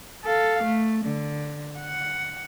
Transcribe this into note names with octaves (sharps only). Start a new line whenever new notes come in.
A4 F5
A3
D3
F#5